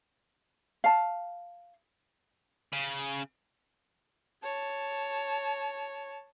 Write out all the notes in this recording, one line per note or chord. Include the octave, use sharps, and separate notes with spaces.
F5 A5
C#3
C#5 A5